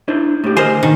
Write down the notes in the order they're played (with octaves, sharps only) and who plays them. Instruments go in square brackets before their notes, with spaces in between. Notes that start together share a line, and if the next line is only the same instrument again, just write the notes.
[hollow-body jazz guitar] D4 E4 C5
A2 G4
[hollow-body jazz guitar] D2 A#4 G#5 [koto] C5 D#5
[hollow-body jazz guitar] B2 [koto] D#3